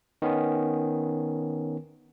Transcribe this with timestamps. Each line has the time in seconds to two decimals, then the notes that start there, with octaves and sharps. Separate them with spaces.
0.22 D#3 B3 C#4